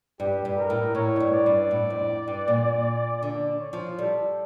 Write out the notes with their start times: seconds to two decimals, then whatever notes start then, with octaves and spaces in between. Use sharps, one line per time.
0.20 G2 G4
0.45 G2
0.57 A#4
0.70 A2
0.95 A2 C#5
1.16 F2
1.20 G2
1.33 D5
1.46 G2
1.71 A2
1.90 F2
2.28 G2
2.48 A#2
3.23 D3 D5
3.61 C#5
3.73 F3
3.99 G3 A4